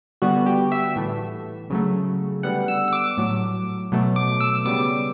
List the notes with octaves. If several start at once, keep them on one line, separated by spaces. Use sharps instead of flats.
D3 G3 B3 F#4
G4
E5
A2 E3 A3
C#3 F#3 A3
D3 G3 B3 F#5
E6
E6
D6
A2 F#3 A3
B2 F#3 A3
D6
E6
C#3 G3 B3 D6